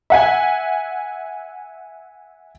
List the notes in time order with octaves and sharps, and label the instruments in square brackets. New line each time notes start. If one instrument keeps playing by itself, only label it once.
[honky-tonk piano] E5 F#5 G#5